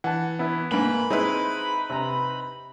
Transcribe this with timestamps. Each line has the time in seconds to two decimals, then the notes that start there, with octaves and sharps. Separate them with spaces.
0.04 E3 F#5 A5
0.39 B3 E4
0.71 G#2 A#3 B4 B5
1.10 G#3 C4 D#4 E4 B4
1.90 C3 A#5